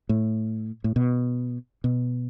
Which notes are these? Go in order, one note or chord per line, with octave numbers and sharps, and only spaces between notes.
A2
A2
B2
B2